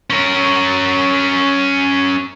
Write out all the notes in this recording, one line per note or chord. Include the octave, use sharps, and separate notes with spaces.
C#4 A#4